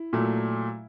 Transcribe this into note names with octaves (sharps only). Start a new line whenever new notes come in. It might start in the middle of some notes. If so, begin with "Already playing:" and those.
Already playing: E4
A#2 F#3 A3